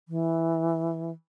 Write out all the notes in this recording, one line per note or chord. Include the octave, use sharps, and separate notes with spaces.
E3